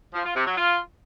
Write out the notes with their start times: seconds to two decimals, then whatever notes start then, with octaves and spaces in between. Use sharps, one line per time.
0.14 F3
0.25 F4
0.36 C3
0.47 F#3
0.57 F4